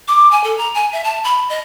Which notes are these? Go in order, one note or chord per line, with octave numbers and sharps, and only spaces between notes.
D6
G#5
A4
A#5
G#5
E5
A5
B5
D#5